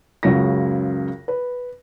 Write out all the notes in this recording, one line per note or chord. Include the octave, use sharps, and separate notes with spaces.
C#2 F#2 C#3 F#4 A#6
B4